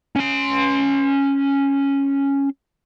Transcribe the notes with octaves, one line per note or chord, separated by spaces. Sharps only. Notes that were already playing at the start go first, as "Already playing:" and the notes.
C#4 C6